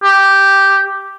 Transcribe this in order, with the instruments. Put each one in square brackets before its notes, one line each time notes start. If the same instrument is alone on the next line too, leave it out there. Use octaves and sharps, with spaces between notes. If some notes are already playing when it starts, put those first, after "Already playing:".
[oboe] G4